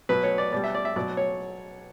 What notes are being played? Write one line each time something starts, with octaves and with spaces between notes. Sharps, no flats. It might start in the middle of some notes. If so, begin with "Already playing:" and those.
B2 F#3 B4
C#5
D5
B2 G3 D5
E5
D5
E5
B2 F#3 D5
C#5